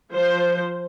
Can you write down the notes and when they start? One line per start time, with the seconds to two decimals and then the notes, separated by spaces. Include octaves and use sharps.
0.12 F3 C5